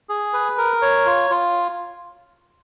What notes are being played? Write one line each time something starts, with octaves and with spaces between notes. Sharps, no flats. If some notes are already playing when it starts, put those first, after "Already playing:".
G#4
B4
A#4
C#5
F4
F4